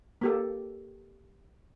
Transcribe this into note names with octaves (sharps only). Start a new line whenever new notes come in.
A#3 G4 A4